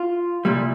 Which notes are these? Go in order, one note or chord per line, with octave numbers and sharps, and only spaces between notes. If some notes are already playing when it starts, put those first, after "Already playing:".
Already playing: F4
C2 A#2 G3